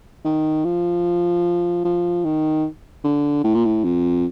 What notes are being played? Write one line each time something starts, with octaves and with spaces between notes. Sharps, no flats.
D#3
F3
F3
D#3
D3
A2
A#2
A2
F2